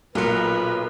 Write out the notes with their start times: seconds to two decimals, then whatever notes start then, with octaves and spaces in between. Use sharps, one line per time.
0.15 B1 A#2 F#3 F4 A#4 B4 C#7